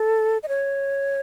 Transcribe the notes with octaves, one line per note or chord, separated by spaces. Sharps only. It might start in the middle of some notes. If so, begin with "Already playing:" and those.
Already playing: A4
D#5
C#5